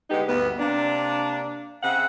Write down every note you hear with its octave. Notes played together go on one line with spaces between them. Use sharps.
D3 G#3 B3 D#4 G4
D2 G2 B3
C3 A#3 D4
C#3 C4 E5 F#5